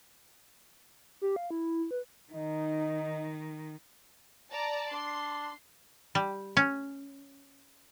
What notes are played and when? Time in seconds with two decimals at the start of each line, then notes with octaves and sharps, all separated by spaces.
1.21 G4
1.36 F5
1.50 E4
1.91 B4
2.32 D#3 D#4
4.52 D5 A5 A#5
4.92 D4 C6
6.15 G3
6.57 C#4